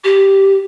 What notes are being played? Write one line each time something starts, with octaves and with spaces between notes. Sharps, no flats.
G4